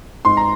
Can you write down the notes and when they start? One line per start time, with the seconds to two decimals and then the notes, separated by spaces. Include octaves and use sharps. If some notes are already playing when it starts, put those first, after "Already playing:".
0.25 G#2 C6
0.37 A#5